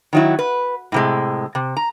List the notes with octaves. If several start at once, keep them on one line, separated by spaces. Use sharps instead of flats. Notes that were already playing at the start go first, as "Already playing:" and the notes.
D#3 F#3 E4
B4
A2 C3 G#3
C3
A#5